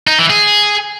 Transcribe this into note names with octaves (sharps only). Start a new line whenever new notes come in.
D#4
E3
G#4